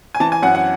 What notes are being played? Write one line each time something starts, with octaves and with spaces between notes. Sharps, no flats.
G#5
E3 A5
G#5
F#2 F#5
F#5